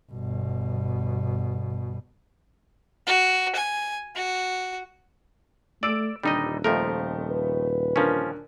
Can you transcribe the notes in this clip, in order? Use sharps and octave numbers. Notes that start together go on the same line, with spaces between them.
G1 B2
F#4
G#5
F#4
A3 D5 E6 D7
D#1 D3 G3 D#4 D#5
F2 F3 A3 A#4
B4
D3 F3 C#4 A#4